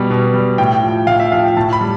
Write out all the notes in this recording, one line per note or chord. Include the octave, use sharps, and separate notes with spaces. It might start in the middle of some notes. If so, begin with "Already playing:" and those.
Already playing: B2 G3
B2
G3
A2 G5
F3
A2 F5
E5
F3 F5
G5
A2 A5
B5
G3